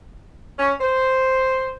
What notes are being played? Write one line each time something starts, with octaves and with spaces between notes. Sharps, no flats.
C#4
C5